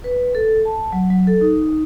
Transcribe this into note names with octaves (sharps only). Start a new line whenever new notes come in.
B4
A4
A5
F#3
F#3
A4
D#4